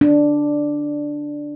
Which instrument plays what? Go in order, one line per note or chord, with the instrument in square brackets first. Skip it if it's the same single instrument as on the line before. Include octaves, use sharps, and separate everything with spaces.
[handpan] D4